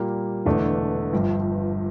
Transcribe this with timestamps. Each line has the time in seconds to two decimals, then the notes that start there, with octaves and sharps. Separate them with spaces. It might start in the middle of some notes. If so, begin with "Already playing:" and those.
Already playing: A#2 G3 A#3
0.46 E1 E2 D3 A3 D4
1.13 G1 G2 F3